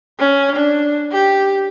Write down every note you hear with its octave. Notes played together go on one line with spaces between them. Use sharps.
C#4
D4
G4